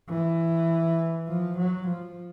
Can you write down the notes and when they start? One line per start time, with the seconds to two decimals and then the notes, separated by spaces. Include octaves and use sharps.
0.09 E3
1.28 F3
1.58 F#3
1.87 F3